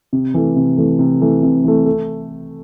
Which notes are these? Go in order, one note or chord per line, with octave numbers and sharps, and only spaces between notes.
C3
E3 A3
C3
E3 A3
C3
E3 A3
C3
E3 A3
A3